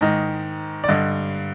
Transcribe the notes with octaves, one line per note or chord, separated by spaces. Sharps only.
G#2 D#3 D#5
D5
G2 D3 D#5